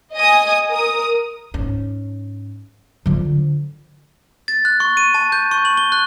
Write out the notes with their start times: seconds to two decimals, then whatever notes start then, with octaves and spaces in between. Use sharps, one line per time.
0.13 D#5 G#5 D#6
0.71 A#4 D#6
1.54 G#2 C#4
3.06 D3 F3
4.48 A6
4.65 F#6
4.80 C#6
4.97 D#7
5.14 A5
5.32 G6
5.51 C#6
5.65 F#7
5.77 G7
5.92 F#6